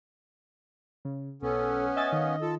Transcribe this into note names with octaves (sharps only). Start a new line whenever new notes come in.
C#3
B1 B3 C#4 A4
D#5 E5 G#5 A6
D#3 F5
F4 A4